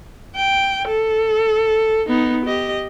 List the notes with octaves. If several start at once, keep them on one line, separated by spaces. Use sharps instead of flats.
G5
A4
B3 D#4
G4 D#5